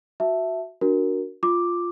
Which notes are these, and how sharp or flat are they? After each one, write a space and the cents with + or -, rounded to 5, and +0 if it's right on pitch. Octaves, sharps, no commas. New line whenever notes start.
F#4 +0 E5 +0 A5 +0
D4 +0 F#4 +0 A#4 +0
F4 +0 D6 +0